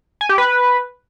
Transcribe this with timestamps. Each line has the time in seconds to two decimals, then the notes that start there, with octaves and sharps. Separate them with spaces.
0.21 G#5
0.29 G4
0.38 B4